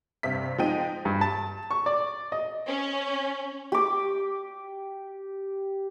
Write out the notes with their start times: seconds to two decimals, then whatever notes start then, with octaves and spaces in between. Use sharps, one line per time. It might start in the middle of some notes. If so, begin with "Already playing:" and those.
0.23 G2 C3 E5 B6
0.58 F3 G#3 D#4 G5 D#7
1.05 G2
1.21 A5
1.71 C#6
1.86 D5
2.32 D#5
2.67 C#4
3.72 G4 D6